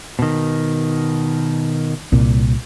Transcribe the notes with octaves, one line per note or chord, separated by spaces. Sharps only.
B2 D#3
C2 A#2